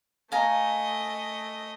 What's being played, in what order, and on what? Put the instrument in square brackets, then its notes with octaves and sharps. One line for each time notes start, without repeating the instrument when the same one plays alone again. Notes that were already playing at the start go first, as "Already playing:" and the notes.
[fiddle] A3 D#5 [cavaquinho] F5 G#5 A#5